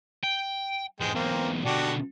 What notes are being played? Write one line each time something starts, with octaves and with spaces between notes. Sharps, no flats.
G5
E2 G#2 G#3 G5
B1 E2 A#3 C4
B2 D3 D4 F#4 G4